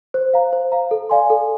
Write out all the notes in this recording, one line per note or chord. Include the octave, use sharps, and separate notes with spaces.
C5
F5 A#5
C5
F5 A#5
A4
D5 F5 G#5 C6
A4